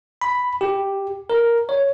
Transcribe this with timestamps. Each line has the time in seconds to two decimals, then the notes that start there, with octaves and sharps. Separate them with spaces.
0.21 B5
0.61 G4
1.30 A#4
1.69 C#5